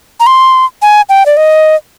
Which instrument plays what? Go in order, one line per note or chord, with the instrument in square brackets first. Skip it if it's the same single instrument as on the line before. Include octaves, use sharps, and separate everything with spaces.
[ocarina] A#5
C6
G#5
G5
D5
D#5